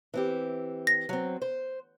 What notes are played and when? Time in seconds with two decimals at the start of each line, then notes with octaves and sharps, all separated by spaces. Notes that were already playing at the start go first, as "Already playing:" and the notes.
0.14 E3 C4 G4
0.87 A#6
1.09 F#3 C4
1.42 C5